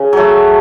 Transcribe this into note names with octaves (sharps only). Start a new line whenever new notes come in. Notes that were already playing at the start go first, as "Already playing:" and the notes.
Already playing: C#3
F#3 A3